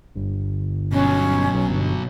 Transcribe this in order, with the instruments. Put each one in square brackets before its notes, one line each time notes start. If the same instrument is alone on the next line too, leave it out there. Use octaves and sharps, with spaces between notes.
[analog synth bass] G1
[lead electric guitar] B2 F#3 [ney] C#4
[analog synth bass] B1
G1